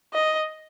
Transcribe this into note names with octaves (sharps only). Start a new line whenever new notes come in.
D#5